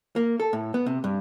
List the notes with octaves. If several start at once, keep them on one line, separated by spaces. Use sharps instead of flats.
A#3
A4
A2
B3
C3
G2